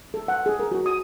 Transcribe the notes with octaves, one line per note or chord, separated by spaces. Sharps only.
A4
F#5
G#4
A#4
F#4
D#6